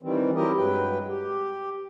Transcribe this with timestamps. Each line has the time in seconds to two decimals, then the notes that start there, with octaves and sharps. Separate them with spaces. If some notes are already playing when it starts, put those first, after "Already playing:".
0.03 D#3 E3 G3 C4
0.35 F#3 C4 E4 G4 A#4 D#5
0.57 G2 F#3 G#3 B4 G5
1.08 G4